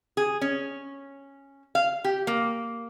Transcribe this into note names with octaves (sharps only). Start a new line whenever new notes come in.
G#4
C#4
F5
G4
A#3